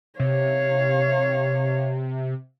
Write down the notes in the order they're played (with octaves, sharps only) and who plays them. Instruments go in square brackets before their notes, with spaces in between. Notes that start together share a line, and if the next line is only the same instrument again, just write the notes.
[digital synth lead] C3 [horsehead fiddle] C#5 F5